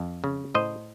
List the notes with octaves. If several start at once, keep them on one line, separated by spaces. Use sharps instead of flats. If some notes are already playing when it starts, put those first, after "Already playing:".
Already playing: F2
C#3
A2 C5 D#5